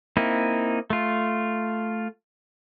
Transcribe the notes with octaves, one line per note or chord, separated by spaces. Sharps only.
A#3 C4 D#4 E4
A3 F4